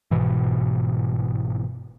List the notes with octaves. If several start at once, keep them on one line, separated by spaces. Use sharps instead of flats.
G1 G#2 B2 E3